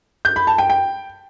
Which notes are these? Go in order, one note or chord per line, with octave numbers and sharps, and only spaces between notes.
G6
B5
A5
G5
G5